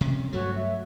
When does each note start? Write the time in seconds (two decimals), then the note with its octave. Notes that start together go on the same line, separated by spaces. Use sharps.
0.01 C3 C#4
0.32 G2 F#3 A3 F#4 C#5
0.55 E5